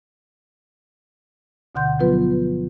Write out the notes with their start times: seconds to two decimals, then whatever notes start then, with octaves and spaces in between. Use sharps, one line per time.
1.75 D2 B2 D3 F#5 C6 G6
1.99 F3 F#3 B3 F4 B4